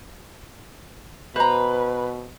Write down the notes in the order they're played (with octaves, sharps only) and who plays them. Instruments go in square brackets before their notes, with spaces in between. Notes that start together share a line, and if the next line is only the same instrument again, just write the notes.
[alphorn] B2 [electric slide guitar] B4 [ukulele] C5 A#5